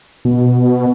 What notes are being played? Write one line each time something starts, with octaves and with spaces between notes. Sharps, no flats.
B2